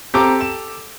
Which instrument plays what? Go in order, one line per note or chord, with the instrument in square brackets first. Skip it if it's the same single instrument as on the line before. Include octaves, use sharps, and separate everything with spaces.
[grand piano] C4 A#5 D7 [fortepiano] G4 A4 D6
[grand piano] E7